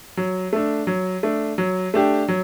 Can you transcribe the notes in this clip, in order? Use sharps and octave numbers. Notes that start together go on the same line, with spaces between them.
F#3
A3 D4
F#3
A3 D4
F#3
A3 D4 G4
F#3